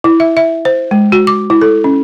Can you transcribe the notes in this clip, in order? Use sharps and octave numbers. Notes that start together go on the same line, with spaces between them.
E4
E5
E5
C5
G#3
F#4
D6
E4
A4
C#4